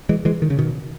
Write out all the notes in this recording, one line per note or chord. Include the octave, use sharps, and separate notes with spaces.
E3 G#3
E3 G#3
D#3
C#3
B2 D#3